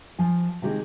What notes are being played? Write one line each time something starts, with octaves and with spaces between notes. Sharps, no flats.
F3 G#5
C3 D#3 G#3 G4